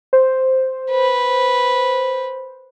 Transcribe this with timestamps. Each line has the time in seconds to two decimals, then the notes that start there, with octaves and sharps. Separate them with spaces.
0.13 C5
0.91 B4